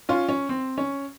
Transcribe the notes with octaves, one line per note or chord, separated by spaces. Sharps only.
C#4 F4
C#4
C4
C#4